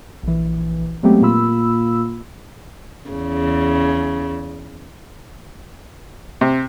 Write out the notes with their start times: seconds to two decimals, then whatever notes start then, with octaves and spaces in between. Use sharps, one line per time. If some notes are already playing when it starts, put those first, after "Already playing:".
0.23 A#1 E3
1.03 F#3 G#3 A3 B3 C4 G4
1.21 A#2 A#3 F4 B5 E6
3.11 E2 C#3
6.41 C3